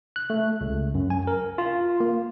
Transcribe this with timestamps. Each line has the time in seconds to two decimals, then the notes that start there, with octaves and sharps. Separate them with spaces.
0.16 F#6
0.30 A3
0.61 C#2
0.95 F#2
1.10 G#5
1.27 A#4
1.58 F4
2.00 A#3